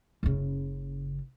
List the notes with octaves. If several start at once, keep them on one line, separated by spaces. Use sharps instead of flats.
F#1 C#3